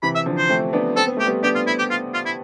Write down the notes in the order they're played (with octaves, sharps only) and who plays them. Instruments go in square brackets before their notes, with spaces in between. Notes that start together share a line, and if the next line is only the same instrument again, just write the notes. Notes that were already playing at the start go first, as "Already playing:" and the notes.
[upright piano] C3 E3 [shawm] B5
[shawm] E5
[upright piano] D3 F3
[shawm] C5
[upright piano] A3 C4
B3 D4
[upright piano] C4 [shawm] A4
[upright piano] B3
[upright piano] A3 [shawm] G4
[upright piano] G3 B3
[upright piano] B3 D4 [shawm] G4
[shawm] F4
E4
G4
F4
F4
E4